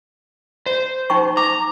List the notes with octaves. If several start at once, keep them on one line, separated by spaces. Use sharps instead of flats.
C5
D#4 G5 C#6
A#5 D6